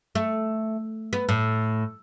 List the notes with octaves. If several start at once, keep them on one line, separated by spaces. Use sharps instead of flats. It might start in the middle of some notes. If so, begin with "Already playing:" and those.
A3
B3
A2